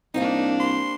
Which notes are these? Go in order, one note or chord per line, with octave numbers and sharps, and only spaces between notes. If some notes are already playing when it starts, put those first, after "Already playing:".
C2 A#3 D4 D#4 G4 C5 F5
C6